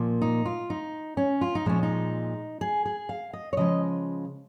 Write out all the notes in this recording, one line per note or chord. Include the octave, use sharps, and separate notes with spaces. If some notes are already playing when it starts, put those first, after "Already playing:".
Already playing: A#2 F3 A#3
D#4
F4
D#4
C#4
F4
D#4
A#2 F3 G#3 C#4
D#4
G#4
G#4
F5
D#5
C#5
C#3 F3 G#3 D#5